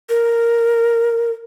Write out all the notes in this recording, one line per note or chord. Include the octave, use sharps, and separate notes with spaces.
A#4